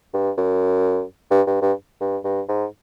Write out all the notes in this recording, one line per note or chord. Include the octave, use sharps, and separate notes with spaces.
G2
F#2
G2
G2
G2
G2
G2
G#2